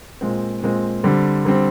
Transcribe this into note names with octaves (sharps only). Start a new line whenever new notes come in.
A#2 G#3 C4
A#2 G#3 C4
D3 G3 C4
D3 G3 C4